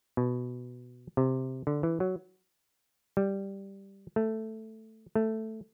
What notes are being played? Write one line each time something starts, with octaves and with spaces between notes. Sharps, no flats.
B2
C3
D3
E3
F#3
G3
A3
A3